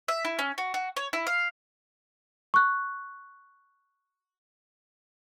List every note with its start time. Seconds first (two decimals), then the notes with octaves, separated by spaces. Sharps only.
0.08 E5
0.25 E4
0.39 C#4
0.58 F#4
0.74 F#4
0.97 C#5
1.13 E4
1.27 F5
2.54 C#6 F#6